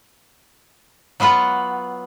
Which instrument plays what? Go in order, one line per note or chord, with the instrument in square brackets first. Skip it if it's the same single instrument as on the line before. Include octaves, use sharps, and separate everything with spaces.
[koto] F#3 B3 F4 B4 F#5